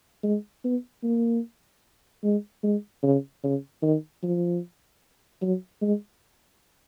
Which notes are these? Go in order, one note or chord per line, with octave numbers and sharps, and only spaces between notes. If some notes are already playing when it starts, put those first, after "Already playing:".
G#3
B3
A#3
G#3
G#3
C#3
C#3
D#3
F3
F#3
G#3